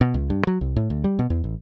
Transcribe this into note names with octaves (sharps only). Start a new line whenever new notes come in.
B2
C#2
G2
F#3
C2
A2
D2
G3
B2
E2
A1